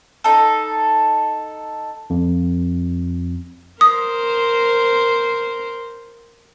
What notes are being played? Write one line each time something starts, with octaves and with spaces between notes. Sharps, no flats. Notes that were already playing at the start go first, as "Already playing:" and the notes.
D#4 A4
F2
A#4 C5 D#6